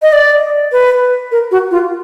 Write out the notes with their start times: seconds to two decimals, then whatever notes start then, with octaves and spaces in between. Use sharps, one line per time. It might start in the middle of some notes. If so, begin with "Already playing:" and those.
0.02 D#5
0.13 D5
0.72 B4
1.32 A#4
1.51 F#4
1.71 F4